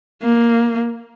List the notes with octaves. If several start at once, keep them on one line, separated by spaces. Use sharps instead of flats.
A#3